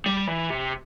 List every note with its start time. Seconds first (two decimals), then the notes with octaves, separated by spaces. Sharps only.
0.06 G3
0.27 E3
0.50 C3